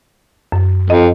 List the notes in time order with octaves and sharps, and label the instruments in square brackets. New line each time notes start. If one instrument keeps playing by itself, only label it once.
[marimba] F#2
[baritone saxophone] F2 [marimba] D#5